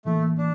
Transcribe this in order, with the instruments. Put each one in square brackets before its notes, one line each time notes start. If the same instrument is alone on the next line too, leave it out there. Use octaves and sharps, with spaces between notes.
[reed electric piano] A2 E3 A#3 [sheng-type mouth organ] A3
[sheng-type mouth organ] D4